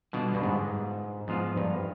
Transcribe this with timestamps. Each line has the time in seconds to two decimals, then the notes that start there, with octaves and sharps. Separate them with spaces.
0.13 B2 D3 G3 D4 F4
0.34 G2
0.43 G#2
1.28 G#2 F3 B3 F4 B4 F5
1.57 G2